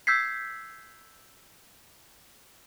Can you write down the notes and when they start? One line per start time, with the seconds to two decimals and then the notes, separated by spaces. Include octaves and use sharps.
0.07 E6 G6 G#6 B6 C7